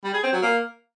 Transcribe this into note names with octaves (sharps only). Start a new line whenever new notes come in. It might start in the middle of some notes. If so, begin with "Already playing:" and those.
G3
G#4
C4
F#3
A#3